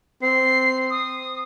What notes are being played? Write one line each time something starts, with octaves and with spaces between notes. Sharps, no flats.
C4 C7
D#6